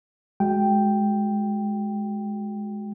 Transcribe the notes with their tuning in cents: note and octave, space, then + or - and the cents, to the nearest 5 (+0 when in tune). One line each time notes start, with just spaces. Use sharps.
G#3 +10 F#4 +0 G5 +0